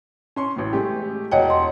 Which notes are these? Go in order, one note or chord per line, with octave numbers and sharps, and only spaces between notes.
C#4 C6 C#6
A1 A2
G#3 A3 G4
E1 C#5 D#5 F#5 G5
C6